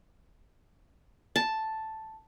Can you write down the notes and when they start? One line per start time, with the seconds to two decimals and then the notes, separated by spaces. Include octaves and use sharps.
1.36 A5